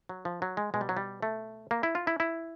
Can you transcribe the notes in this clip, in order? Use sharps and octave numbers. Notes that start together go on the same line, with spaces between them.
F#3
F3
F#3
G#3
B2 G#3
G3
F#3
G3
A3
A#3
E4
F4
E4
E4